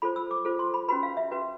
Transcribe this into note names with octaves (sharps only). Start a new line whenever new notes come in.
F4 A4 C5 B5
E6
D6
F4 A4 C5
C6
B5
C#4 F#4 B4 B5
F5
E5
C#4 F#4 B4